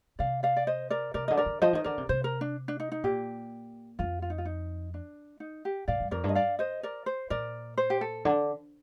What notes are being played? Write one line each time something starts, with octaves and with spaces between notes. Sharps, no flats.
C3 D5 F5
D5 F5
D5
C5 D#5
A#4 D5
C3 A#4 D5
D3 D#5
A#4 D5
D3
F3 C5 D#5
D#3 D#5
D3 A#4 D5
C3
C3 C5
A#4
D4
D4
D#4
D#4
A#2 G4
F2 F4
F4
D#4
F4
D#4
D4
D#4
G4
A2 D5 F5
G2
F2 A#4 D5
G2
D#5
D5 F5
C5 D#5
A#4 D5
C5
A#2 A#4 D5
C5
G4
A4
D3